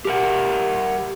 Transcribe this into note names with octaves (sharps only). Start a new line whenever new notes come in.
G4 A#4 F#5